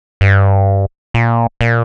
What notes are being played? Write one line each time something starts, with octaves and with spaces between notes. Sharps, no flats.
G2
A#2
A#2